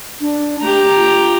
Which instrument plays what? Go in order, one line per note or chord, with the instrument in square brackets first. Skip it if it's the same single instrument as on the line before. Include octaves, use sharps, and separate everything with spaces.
[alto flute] D4
[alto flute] A3 [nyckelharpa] G4 A#5
[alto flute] F4